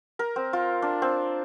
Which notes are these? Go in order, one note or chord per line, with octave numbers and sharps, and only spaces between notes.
A#4
C4
F4
D4
C4